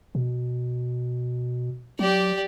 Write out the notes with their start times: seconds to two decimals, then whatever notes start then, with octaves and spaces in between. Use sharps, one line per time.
0.15 B2
1.99 F#3 G4 D5